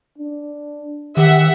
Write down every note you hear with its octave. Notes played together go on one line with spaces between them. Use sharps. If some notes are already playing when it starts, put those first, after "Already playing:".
D4
D#3 G4 E5 F#5